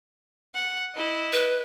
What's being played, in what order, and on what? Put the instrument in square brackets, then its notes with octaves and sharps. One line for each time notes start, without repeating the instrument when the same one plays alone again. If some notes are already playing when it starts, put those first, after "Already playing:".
[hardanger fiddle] F#5
E4 D#5
[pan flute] B4